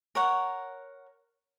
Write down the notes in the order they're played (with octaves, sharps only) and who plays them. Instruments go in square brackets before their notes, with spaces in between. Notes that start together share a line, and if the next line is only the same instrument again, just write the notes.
[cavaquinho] A#4 C#5 F#5